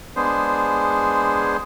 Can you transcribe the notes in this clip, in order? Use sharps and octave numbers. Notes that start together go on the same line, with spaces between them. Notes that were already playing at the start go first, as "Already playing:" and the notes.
G#3 B3 D4 G#4 C5